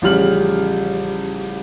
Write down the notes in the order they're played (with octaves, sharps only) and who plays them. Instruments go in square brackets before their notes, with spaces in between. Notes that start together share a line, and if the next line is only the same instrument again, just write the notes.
[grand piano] A1 C#3 F3 G3 F6 F#7